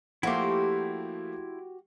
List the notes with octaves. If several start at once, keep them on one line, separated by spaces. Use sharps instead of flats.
F3 A3 A#3 E4 F#4 G4 C6